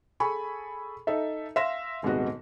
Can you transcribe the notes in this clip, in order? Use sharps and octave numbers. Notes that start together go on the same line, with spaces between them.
G#4 A4 G#5 B5 C#6
D#4 A4 D#5 E5
E5 F5 C6 E6 A#6 E7
D#1 G#2 C3 B3 F#4 D#5